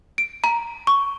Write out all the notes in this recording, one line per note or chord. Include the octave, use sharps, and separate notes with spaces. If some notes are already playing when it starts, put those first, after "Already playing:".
D7
A#5
C#6